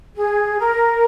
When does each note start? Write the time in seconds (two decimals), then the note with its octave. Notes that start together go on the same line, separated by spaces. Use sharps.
0.16 G#4
0.59 A#4